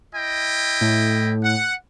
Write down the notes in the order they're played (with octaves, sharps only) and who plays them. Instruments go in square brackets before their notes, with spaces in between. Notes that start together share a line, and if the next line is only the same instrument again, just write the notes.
[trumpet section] E4 D#5 G5
[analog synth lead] A2
[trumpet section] F#5